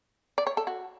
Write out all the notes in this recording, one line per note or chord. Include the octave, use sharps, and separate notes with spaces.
D5
C#5
A4
F#4